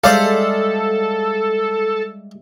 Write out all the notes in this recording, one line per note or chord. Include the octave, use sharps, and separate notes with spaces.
G3 G#3 A4 C5 D5 E5 F5